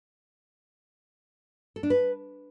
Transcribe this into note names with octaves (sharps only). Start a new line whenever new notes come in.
A4
D4
B4